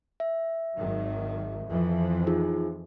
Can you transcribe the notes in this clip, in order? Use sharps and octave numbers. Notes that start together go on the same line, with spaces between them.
E5
G#1 D#3 F#3
F2 E3 F3
D#4 F4 G#4